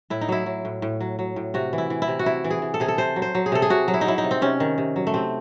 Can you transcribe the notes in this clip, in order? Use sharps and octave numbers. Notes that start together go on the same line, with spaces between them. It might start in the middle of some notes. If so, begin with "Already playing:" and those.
A2 E4
D#4
F#3 E4
F#3
A2
A2
F#3
F#3
A2
C3 F#4
E3
E4
E3
E4
C3
F#4
C3 E4
E3
G#4
E3
A4
C3 G#4
A4
C3 C5
F#3
C5
F#3
G#4
C3 A4
G#4
C3 F#4
F#3
E4
D#4
F#3 E4
D#4
C3
C4
C3 C#4
D#3
C3
F#3
A3
C3 C4